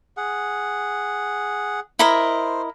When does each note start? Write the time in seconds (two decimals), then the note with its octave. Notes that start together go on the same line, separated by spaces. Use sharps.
0.17 G#4 F#5
1.99 E4 A#4 C5 D#5